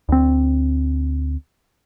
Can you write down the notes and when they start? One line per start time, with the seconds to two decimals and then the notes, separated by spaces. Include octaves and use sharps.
0.09 D2 C4